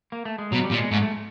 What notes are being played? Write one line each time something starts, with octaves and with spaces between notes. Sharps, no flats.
A#3
A3
G#3
B2 F#3
G3
A#2
G#3
G#2 A3
A3